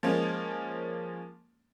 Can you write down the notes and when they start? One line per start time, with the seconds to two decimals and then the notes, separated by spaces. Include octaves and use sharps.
0.03 F3 G#3 A#3 C#4